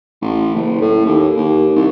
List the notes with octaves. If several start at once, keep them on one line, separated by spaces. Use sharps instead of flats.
A1
F#1
A2
D#2
D#2
C2